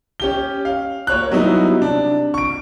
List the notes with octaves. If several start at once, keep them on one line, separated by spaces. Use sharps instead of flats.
C#4 G4 G7
F5
A#3 C#5 F#6
F#3 G3 B3 D#4 E4
C3 D4
C#6 D7